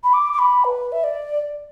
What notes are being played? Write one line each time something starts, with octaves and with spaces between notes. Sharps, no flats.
B5
D6
D6
B5
B4
E5
D5